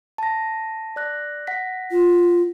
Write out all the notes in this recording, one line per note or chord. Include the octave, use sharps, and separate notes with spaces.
A5 A#6
D5 F#6 A#6
F#5 A#6 B6
F4